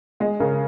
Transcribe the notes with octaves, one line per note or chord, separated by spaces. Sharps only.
G#3 D#5
C#3 A#4